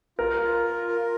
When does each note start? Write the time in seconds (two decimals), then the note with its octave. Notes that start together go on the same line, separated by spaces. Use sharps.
0.19 F4 A#4
0.42 F4
0.65 A#4
0.88 A#4